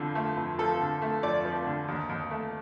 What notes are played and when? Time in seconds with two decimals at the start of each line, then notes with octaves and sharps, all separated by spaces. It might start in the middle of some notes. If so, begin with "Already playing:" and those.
Already playing: F2 D3 F3 F4
0.15 A3
0.37 F2
0.59 F3 A4
0.80 D3
1.02 A3
1.23 F2 D5
1.45 F3
1.66 D3
1.88 D#2
2.09 D#2
2.31 A3